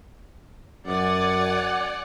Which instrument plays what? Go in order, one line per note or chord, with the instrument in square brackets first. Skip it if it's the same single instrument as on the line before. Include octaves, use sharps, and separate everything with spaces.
[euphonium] F#2 [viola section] D5 F#5 G#5